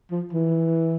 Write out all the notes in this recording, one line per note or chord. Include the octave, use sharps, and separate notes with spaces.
F3
E3